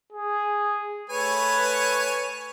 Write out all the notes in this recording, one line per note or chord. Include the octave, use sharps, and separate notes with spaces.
G#4
A3 B4 C#5 G#5